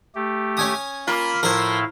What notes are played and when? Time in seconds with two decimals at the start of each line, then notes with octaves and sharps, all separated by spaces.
0.15 A3 G4
0.57 C#4 G#5 D#6
1.07 A#3 F4 B5
1.43 A2 F3 E4 A#4 C5 F5